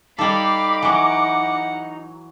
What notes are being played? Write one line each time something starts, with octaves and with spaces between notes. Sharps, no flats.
G3 D#4 A4 F5 B5 D6
E3 F#3 F#5